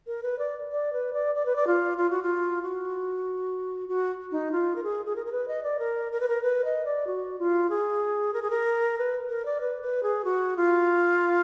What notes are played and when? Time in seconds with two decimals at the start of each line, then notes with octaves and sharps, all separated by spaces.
0.07 A#4
0.23 B4
0.39 D5
0.72 D5
0.93 B4
1.13 D5
1.35 D5
1.46 B4
1.56 D5
1.67 F4
1.98 F4
2.11 F#4
2.23 F4
2.62 F#4
3.89 F#4
4.32 D#4
4.52 F4
4.76 A#4
4.84 G#4
5.06 G#4
5.16 A#4
5.26 A#4
5.32 B4
5.48 D#5
5.63 D5
5.79 A#4
6.12 A#4
6.20 B4
6.28 A#4
6.43 B4
6.65 D#5
6.85 D5
7.07 F#4
7.39 F4
7.70 G#4
8.34 A#4
8.42 G#4
8.50 A#4
8.98 B4
9.29 A#4
9.45 D5
9.61 B4
9.82 B4
10.03 G#4
10.24 F#4
10.57 F4